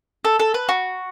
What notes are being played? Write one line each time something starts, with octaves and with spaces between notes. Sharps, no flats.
A4
A4
B4
F#4